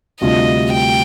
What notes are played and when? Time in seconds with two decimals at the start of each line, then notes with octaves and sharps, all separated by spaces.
0.21 D2 C3 G3 D4 F4 D#5
0.74 G5